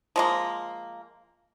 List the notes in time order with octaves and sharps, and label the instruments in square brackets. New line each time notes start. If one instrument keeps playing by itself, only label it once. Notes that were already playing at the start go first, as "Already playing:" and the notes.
[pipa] F3 G#3 A#3